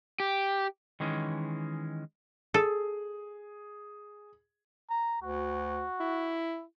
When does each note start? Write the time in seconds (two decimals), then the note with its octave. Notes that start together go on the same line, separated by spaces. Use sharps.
0.20 G4
1.00 D#3 E3 G#3 C#4
2.54 G#4 A4
4.90 A#5
5.22 D2 F#4
6.00 E4